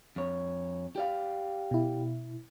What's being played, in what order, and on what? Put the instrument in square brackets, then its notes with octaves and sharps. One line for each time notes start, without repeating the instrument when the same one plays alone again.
[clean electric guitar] F2 C#5
G4 D5 F5
[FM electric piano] B2 E4